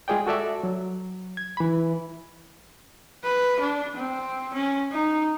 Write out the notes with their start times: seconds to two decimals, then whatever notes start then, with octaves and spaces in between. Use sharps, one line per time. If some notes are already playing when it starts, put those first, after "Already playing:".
0.08 G#3 F4 G#4 D5 G5
0.27 F#4 A4 D5 E5
0.64 F#3
1.37 G#6
1.57 E3 B5
3.24 B4
3.60 D4
3.96 C4
4.54 C#4
4.92 D#4